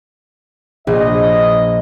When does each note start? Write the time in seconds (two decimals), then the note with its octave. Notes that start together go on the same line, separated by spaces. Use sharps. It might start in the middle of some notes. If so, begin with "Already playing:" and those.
0.87 A#1 D#5